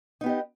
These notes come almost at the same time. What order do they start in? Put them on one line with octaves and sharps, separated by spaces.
D#4 B3 G4 D#5